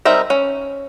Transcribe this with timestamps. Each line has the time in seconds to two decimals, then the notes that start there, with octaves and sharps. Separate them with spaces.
0.05 G3 C4 D#4 A#4 E5
0.30 C#4